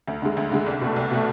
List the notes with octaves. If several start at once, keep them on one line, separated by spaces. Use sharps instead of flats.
D2
D3 G#3
D2
D3 G#3
C2
B2 A3
C2
B2 A3